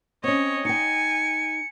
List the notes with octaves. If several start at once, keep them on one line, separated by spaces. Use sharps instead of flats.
C4 C#4 C#5 D#5
D#4 G5 G#5 C#7